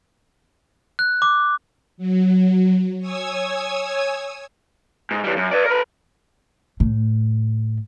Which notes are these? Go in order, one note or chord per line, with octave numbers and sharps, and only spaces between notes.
F#6
D6
F#3
C#5 G#5 D#6 E6 G#6
G#2
E3 G3
F#2
B4 D5
A#4 B4
A2